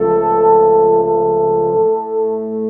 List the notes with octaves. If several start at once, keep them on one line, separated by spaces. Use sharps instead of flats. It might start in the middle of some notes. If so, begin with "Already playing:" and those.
Already playing: C#2 C#3 F3 A3 A4
A4
A2 A3